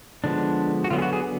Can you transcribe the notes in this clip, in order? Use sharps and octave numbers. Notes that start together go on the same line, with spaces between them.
D3 F3 G#3 B3 D4
F#4
D3 F#3 B3 F4
G#4
F#4
G#4